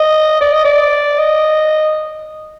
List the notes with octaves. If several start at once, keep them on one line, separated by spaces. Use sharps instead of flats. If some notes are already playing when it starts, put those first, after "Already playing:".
Already playing: D#5
D5
D#5
D5
D#5